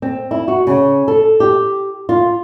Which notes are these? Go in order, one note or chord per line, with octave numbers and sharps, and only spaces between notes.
C4
E4
F#4
C#3
A4
G4
F4